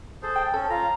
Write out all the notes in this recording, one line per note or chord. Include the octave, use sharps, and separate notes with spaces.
G#4 A4 C5
G5
C#4 A4
F4 A#5